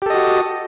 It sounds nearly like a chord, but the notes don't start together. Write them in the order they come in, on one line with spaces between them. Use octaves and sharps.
G4 A4 D#5 F#4